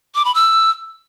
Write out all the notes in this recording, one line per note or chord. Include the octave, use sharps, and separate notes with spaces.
D6
B5
E6